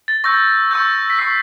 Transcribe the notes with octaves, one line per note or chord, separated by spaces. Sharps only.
A6
C#6 E6 G6 A#6
C#6 E6 G6
B6
C#6 E6 G6 C7